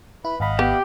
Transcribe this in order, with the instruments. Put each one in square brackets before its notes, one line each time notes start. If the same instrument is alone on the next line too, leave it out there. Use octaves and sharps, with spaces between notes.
[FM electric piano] E4 [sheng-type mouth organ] B4 B5
[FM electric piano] G#1 B5 [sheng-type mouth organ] D#5 F5 F#5
[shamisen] B3 [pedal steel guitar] G4